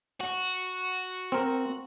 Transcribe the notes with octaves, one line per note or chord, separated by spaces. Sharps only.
F#4
C4 A#4